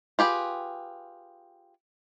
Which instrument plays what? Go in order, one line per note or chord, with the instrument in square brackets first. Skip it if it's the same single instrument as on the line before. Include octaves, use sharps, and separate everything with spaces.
[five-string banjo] F4 G4 G#4 B4